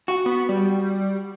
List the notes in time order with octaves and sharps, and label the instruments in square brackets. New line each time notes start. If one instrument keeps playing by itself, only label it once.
[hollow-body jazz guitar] F#4
[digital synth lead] B3
G3